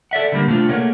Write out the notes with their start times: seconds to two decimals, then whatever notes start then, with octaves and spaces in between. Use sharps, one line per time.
0.11 A4 D5 E5 F#5
0.32 D3 G3 A#3
0.47 C3 A3 D4 F4
0.69 A3 A#3 G#4 A#4 C#5 F#5